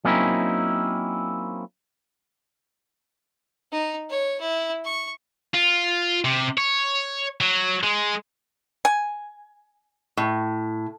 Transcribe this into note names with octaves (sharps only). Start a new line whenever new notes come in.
F#3 A#3 C4 C#4 D#4 E4
D#4
C#5
E4
C#6
F4
C3
C#5
F#3
G#3
G#5
A2